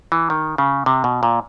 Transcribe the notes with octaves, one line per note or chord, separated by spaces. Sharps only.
E3
D#3
C#3
C3
B2
A#2